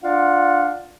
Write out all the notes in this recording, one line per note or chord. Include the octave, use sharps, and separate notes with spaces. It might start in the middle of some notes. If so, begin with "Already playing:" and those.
D4 F4 D5 F5 F#5